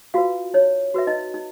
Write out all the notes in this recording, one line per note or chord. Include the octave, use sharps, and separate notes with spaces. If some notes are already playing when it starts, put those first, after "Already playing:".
F4 F#4 B4 F5
D#4 C#5
F#4 B4 E5
D#4 D#5
D#4